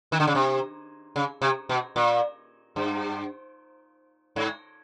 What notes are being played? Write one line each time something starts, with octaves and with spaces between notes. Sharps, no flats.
D#3
D3
C#3
C3
C#3
C3
B2
A#2
G2
G#2